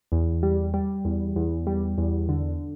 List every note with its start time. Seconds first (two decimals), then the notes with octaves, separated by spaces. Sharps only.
0.12 E2
0.43 G3
0.74 G3
1.05 E2
1.36 E2
1.67 G3
1.98 E2
2.29 D3